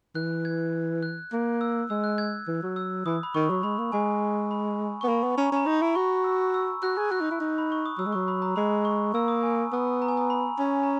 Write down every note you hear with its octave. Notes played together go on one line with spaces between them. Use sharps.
E3 F#6
G#6
F#6
A#3
E6
G#3 E6
F#6
G#6
E3
F#3
E6
E3 D#6
B5
D#3 C#6
F#3
G#3 B5
A#3
G#3 G#5
B5
B3 C#6
A#3 B5
B3
C#4 A#5
B5
C#4 A#5
D#4 B5
A#5
E4
B5
F#4 C#6
E6
E6
F#4 F#6
G#4
F#4 F#6
D#4
E4
D#4
B5
C#6
D#6
F#3 E6
G#3
F#3 C#6
B5
A#5
G#3 B5
C#6
A#3 E6
D#6
G#5
B3
A#5
G#5
A#5
B5
C#4
A#5